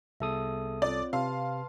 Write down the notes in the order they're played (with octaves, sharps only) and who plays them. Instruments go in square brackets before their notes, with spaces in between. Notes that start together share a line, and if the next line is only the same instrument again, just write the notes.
[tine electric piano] C2 A4 D#6 [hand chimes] B3 G#4 E5
[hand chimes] C4 F4 C#5 [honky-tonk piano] D5
[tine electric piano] C3 [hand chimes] B4 A5 C6 [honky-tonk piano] F5